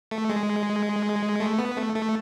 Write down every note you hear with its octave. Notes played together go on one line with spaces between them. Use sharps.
A3
G#3
A3
B3
A3
A3